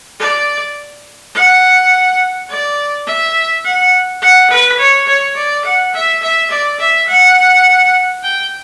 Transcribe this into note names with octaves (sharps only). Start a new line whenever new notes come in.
D5
F#5
D5
E5
F#5
F#5
B4
C#5
C#5
D5
F#5
E5
E5
D5
E5
F#5
G5